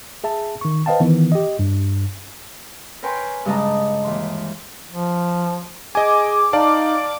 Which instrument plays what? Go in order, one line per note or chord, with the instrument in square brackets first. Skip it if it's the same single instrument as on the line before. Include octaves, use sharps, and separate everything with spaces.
[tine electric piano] G#4 E5 A5
D#3 C#6
B4 C5 D#5 F5 G5 A5
D#3 E3 B3
G4 D#5
G2
[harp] A#4 B4 C#5 G5 G#5 C6
G2 C#3 G#3 D#5 A5 A#5
D#2 E3 C6
[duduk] F3
[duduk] G#4 [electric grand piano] D#5 G#5 [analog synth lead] D6
[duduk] D#4 [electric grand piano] D5 F5 A5